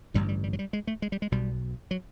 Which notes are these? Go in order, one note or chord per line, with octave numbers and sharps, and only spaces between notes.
A1 G2 D3 G3
G3
G3
F#3
G3
G#3
A3
G#3
G3
G#3
B1 B2 G3
F#3